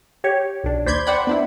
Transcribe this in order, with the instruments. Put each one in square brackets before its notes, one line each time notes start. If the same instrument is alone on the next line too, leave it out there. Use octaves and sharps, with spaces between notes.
[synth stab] G4 C#5
B1 D4
D#2 C5 D5 B5 G6 G#6
C5 D5 F#5 G5 B5
B3 D4 E4